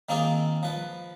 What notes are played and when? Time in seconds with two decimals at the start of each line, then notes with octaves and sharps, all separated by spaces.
0.09 D#3 A#3 C4 F4 G#4 A#4
0.63 F3 B4